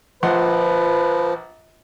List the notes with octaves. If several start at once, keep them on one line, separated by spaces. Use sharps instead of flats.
A#1 F3 B4 F#5 C6